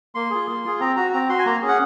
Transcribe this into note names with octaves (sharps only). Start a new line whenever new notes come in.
A#3 C6
F4 G#4
A#3
F4 G#4
C4 A#5
F#4 A#5
C4 A#5
F#4 C6
G#5
A#3 A#5
C#4 G#4
F#5